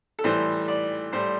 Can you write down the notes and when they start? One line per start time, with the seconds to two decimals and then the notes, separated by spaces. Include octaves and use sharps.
0.19 A4
0.24 A2 E3 G3 C5
0.68 D5
1.13 A2 G3 C5